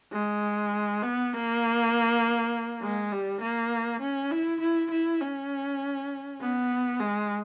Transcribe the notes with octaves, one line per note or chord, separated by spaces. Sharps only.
G#3
B3
A#3
G#3
G3
A#3
C#4
E4
E4
E4
C#4
B3
G#3